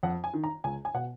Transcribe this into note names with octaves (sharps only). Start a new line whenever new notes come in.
F2 F#5
G#5
D#3
A#5
C#2 G#5
G#5
B2 F#5